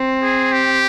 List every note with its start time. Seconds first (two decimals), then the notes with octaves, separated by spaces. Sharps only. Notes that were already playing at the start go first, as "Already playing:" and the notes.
Already playing: C4
0.23 G#4
0.53 G4